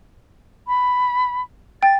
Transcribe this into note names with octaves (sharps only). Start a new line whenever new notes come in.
B5
G5 A6